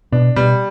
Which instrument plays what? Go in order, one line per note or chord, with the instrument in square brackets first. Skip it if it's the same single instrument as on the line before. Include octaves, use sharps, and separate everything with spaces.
[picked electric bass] B2 [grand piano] D4
[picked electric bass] B2 [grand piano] G3